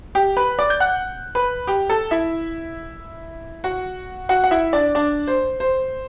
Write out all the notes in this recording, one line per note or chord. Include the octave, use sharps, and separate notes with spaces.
G4 G5
B4 B5
D5 D6
G6
F#5 F#6
B4 B5
G4 G5
A4 A5
E4 E5
F#4 F#5
F#4 F#5
F#5
E4 E5
D4 D5
D4 D5
C5
C5